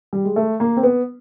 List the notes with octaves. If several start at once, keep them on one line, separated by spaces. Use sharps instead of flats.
G3
G#3
A3
A#3
C4
B3